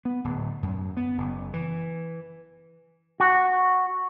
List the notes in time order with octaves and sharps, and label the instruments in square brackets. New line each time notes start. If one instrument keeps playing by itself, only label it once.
[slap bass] B3
D1
F#2
B3
F#1
E3
[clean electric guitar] F#4